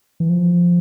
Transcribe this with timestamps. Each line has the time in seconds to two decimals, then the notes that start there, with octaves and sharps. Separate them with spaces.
0.20 E3
0.29 F3